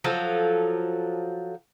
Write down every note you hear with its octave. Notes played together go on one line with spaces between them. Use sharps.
F3 F#3 A4